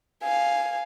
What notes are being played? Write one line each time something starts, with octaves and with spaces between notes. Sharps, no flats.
F5 G#5